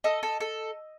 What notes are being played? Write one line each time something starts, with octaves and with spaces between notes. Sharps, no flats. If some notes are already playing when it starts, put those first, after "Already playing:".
A4 D#5
A4
A4